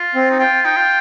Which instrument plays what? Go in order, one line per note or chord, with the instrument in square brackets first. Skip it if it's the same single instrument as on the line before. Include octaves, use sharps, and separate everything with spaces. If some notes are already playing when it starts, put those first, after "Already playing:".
Already playing: [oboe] F4
[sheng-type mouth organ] C4
[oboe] D#4
[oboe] F4 [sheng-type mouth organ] G5
[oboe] D#4 [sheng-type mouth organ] G5
[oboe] F4